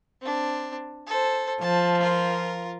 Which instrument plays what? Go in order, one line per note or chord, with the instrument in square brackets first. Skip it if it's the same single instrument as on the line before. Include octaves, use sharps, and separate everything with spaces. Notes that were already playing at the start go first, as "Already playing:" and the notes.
[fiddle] C4 D4
A4 C5
[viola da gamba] F3 [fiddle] A5
[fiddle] F4 A#4